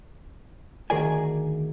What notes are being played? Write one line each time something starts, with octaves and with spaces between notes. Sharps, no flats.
D2 D#3 G#4 A#4 D5 G#5